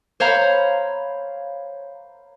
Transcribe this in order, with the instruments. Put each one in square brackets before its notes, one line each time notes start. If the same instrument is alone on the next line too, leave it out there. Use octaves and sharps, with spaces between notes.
[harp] C5 C#5 F5 A#5 B5